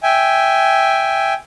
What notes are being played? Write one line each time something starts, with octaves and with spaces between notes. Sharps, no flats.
E5 G5 G#5